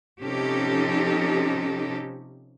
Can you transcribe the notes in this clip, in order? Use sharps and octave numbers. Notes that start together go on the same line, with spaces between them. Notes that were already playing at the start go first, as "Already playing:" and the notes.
C3 F3 C#4 D#4 G4 A4